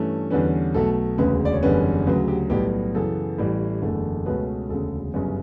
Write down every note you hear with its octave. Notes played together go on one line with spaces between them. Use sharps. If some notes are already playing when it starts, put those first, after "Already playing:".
Already playing: G2 E3 A3 C#4
E2 D3 G3 C#4 B4
B1 B2 A3 A4
E1 D2 C#3 B4
D5
C#5
F#1 E2 D3 G3 C#4 B4
D2 C#3 F#3 B4
G4
B1 A2 G3 B3 G4
F#2 C#3 E3 B3 A4
A1 A2 E3 G3
F#1 E2 D3 A3
C#2 B2 A3 C#4 B4
E1 D2 C#3 A4
G1 F#2 C#3 G3 C#4